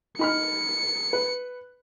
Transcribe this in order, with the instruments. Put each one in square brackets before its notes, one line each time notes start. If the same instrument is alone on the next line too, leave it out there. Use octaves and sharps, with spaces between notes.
[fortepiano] D#4 B5 F6 [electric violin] C#7
[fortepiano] B4